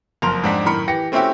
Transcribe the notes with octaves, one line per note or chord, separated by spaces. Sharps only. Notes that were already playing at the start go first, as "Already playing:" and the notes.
F#1 F2 A#4 C6 F7
F2 G#2 C4 D4 F#5 B6
F#2 A2 D#3 A#4 B5 C#7
E3 G4 A#6 C#7
A3 C4 C#4 E4 F#4 G4